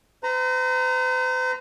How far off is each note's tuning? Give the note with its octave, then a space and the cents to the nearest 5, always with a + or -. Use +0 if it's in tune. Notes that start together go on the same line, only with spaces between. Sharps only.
C5 -45 A#5 -5